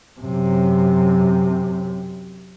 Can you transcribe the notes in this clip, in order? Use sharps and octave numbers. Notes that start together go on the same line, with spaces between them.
F#2 C3